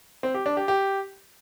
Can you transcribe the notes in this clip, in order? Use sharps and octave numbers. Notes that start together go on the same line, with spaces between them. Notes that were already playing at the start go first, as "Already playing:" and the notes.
C4
G4
D4
G4
G4